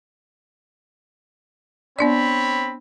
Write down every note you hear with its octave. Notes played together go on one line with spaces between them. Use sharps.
B3 C4 D4 C#5 D5 B5